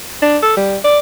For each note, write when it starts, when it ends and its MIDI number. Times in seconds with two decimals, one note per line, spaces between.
0.22 0.38 62
0.43 0.56 69
0.57 0.77 55
0.84 0.99 74